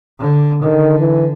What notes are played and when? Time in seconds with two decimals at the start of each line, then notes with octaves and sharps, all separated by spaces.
0.20 D3
0.62 D3 D#3
0.99 E3